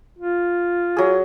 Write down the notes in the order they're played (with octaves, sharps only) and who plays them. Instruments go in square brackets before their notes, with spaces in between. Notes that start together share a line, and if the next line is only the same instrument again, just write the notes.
[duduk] F4
[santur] F#3 G#4